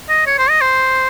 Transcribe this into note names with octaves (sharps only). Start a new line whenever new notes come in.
D#5
C#5
C5
D#5
C5